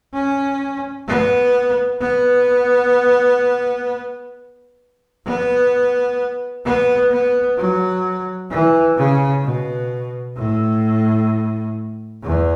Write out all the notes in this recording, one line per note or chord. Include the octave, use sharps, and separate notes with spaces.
C#4
B3
B3
B3
B3
B3
F#3
E3
C#3
B2
A2
E2